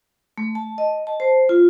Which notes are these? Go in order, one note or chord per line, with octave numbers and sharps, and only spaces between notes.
A3
A5
D#5
A5
C5
F4